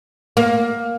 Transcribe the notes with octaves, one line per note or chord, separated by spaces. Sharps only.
A#3